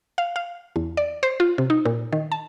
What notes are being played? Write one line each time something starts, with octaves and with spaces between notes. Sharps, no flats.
F5
F5
E2
D5
C5
F4
C3
D#4
A#2
D#3
A5